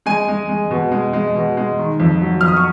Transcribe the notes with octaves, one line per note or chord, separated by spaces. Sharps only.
G#3 G#5
G#3
G#3
B2
G#3
G#3
B2
G#3
D#3
F2
F#3
F2 F6
D#6
C#6